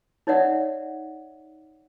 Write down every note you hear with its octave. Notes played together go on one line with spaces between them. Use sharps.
D#4 C#5 D5 E5 F#5